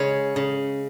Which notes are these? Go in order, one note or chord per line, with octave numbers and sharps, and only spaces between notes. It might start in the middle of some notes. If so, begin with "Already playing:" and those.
Already playing: C#3 G#3 C#4 C#5
C#3